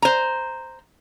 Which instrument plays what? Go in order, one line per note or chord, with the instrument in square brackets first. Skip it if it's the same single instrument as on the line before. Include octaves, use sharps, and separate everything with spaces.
[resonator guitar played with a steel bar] C5 A#5